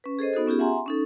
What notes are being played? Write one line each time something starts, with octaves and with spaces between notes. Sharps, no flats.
C#4 B4
G#4 A4 C5 D#5
B3 D#4 F#4 A4
B3 C#4 F4 G4 G#4
E5 F#5 G#5 A#5 C6
C#4 D#4 A4